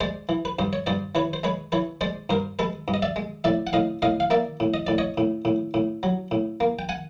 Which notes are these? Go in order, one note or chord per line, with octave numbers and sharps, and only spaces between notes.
G#3 C5 D5
E3
B4
G2 C5
C#5
G2 C5 D5
E3 B4 C#5
C5
G#3 B4 C#5
E3 B4 C#5
G#3 C5 D5
G2 A#4 C5
G#3 A4 B4
G2
D#5
D5 E5
G#3
A2 D5 E5
F#5
A2 D#5 F5
A2 D#5 F5
F5
A#3 D5 E5
A2
D#5
A2 D5
C#5 D#5
A2
A2
A2
F#3
A2
A#3
G5
F#5 G#5